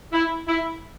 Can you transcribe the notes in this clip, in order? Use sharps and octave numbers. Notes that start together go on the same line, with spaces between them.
E4
E4